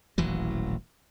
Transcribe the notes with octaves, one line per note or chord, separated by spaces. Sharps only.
D#1 A1 E3 F#3